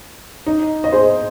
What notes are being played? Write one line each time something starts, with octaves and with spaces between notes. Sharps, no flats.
D#4
D#5
G#4 C5